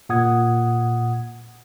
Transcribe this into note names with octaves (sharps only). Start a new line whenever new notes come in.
A#2 F#5 D#6 G#6